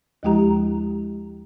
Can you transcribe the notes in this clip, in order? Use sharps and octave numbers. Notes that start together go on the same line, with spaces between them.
D#2 F3 G#3 E4 G4 A#5